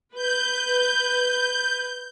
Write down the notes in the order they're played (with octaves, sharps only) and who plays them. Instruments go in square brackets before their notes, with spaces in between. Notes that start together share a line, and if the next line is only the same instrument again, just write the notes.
[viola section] B4 [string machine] G6